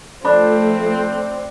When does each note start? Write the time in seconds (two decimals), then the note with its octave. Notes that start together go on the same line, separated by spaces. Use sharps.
0.25 F3 A3 C4 D4 A5 B5